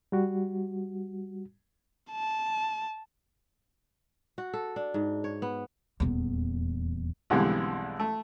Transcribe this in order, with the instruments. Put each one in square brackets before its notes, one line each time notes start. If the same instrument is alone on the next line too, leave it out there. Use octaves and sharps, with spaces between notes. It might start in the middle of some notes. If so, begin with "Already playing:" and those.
[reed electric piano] G3 F#4
[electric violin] A5
[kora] F#4
A4
D4
G#2
C#5
B3
[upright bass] D#1 E2
[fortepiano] B1 F2 D3 E3 G3 G#3
A3